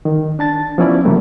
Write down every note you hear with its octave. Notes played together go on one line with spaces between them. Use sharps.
D#3
D4 A5 A6
F3 B3 C#4 E4 D5
C3 E3 F#3 G3 A3 A#3